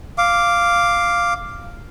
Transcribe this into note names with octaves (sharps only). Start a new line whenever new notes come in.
F5 D6